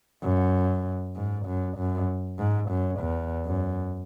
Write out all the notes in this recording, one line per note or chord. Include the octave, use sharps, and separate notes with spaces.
F#2
G#2
F#2
F#2
G#2
F#2
E2
F#2